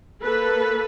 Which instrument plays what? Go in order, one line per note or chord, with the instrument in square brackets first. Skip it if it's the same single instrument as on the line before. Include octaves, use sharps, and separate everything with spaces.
[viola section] A#3 A4 B4